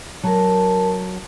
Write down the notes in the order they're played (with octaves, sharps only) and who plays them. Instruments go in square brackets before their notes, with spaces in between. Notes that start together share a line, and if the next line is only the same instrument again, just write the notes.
[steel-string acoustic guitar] F#3 [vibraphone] A#4 A5